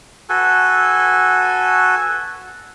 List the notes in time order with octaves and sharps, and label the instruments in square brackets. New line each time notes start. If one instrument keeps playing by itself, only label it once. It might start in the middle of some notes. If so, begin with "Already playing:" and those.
[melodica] F#4 A4 B4 G#5